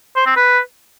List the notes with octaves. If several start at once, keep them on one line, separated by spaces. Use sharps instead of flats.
C5
C4
B4